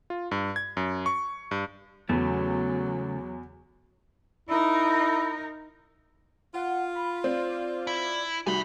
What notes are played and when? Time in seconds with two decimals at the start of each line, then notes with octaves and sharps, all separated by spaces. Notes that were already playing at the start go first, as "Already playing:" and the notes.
0.10 F4
0.31 G2
0.56 G#6
0.77 F#2
1.06 C#6
1.51 G2
2.09 E2 C#3 F#3 A3
4.49 D#4 E4 A#4
6.55 F4 F#5
6.95 B5
7.24 C4 D5
7.87 E4
8.47 C2 D#3 G3 F#4 G#5 B5